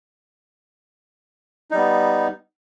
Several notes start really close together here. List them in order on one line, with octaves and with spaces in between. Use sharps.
D#4 G3 B3